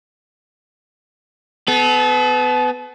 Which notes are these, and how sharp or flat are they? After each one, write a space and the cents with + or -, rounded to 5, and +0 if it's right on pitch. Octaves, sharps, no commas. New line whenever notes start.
B3 +25 A4 -40